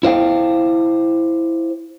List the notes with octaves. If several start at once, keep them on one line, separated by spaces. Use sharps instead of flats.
E4 C5 F5 G5